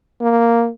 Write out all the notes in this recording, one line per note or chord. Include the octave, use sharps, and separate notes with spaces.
A#3